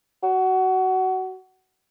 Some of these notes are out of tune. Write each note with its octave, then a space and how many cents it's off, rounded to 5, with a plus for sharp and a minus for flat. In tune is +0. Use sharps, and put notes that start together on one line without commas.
F#4 +20